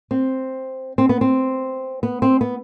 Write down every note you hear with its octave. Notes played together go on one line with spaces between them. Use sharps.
C4
C4
B3
C4
B3
C4
B3